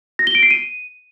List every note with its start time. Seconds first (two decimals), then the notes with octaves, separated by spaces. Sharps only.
0.19 A#6
0.27 G7
0.35 D7
0.43 C7
0.51 D#7